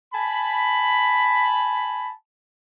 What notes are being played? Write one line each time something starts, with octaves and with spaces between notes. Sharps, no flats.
G#5 A5 B5